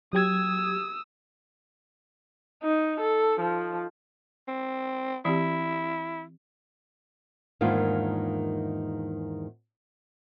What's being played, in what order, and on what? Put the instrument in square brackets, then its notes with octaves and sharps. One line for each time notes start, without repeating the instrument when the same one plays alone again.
[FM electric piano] F#3 G4 G#6 [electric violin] D#6 E6
[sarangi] D#4
A4
F3
[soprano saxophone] C4
[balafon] E3 C4 G4 [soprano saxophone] E4
[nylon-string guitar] E2 G#2 D#3 A#3 D4 F4